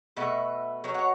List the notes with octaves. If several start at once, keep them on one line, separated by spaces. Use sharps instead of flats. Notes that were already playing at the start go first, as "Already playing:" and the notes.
B2 A3 B4 E5
B2 F#3
C#5 F#5